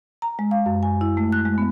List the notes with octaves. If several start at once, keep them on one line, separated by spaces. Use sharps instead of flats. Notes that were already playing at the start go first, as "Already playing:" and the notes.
A#5
G#3
F5
F#2
G#5
E4
A3
F#6
G#3
B3